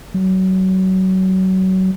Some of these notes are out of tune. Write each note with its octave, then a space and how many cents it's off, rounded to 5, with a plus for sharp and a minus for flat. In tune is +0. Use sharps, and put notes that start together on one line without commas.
F#3 +25